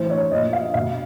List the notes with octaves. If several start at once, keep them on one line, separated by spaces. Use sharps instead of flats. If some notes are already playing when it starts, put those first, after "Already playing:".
Already playing: A2 E3 C5
C#5
A#2 F3 D#5
F5
B2 F5